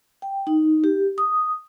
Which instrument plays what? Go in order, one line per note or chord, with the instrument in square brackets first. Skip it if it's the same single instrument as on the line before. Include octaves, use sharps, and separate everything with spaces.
[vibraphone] G5
D#4
G4
D#6